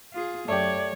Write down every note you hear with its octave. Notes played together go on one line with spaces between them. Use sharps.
F4 G#4
F#2 A3 G4 C#5 D5